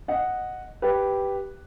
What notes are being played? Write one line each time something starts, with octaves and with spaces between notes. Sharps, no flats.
D#5 F#5
G4 B4